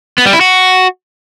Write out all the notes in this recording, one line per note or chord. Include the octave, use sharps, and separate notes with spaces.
B3
G3
E4
F#4